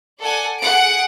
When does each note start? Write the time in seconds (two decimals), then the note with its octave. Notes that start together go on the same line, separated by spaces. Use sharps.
0.19 A4 D5 F#5 G#5
0.60 G#4 F#5 D7